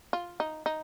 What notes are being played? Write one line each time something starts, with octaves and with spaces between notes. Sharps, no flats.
F4
D#4
D#4